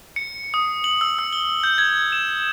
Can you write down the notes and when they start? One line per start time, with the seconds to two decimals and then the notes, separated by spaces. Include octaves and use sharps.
0.16 C#7
0.54 D#6
0.84 F#7
1.01 E6
1.19 E6
1.33 G7
1.64 G6
1.78 G#6
2.12 E7